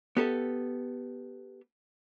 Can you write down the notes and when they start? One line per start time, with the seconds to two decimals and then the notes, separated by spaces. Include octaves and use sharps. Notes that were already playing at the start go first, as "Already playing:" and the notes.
0.17 B3 G4 A4 E5